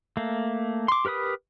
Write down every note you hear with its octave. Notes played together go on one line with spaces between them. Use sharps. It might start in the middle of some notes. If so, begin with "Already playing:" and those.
A3 A#3
C6 D6
G4 A#4 B4 B5 D#6